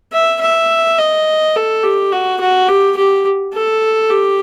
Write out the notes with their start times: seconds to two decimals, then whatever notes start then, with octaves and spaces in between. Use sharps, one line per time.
0.13 E5
0.41 E5
0.98 D#5
1.56 A4
1.83 G4
2.12 F#4
2.41 F#4
2.68 G4
2.97 G4
3.54 A4
4.10 G4